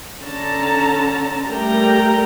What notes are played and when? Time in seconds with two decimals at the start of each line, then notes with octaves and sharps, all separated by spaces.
0.24 D3 C#4 A4 A5 A#5
1.46 G3 A3 G4 A#4 G5 A#5